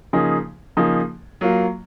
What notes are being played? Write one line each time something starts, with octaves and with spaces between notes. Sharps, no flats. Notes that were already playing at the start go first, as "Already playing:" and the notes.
C#3 F3 A#3 D#4 G#4
C#3 F3 A#3 D#4 G#4
F#3 A#3 F4